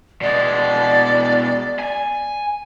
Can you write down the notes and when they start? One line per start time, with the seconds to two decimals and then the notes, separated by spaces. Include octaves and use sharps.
0.21 B2 G#3 D5
1.79 G#5